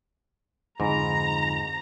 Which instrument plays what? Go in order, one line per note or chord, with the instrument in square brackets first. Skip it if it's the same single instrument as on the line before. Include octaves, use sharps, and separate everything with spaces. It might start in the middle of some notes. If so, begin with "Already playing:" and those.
[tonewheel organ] F2 [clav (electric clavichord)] G#2 [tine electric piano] D3 D#4 B5 [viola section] A#5